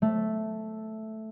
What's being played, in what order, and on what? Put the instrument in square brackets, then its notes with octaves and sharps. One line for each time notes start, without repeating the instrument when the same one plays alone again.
[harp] A3